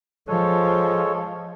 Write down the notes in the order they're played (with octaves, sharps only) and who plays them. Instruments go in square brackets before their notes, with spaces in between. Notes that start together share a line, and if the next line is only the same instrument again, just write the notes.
[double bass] F3 [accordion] G#3 A4 C#5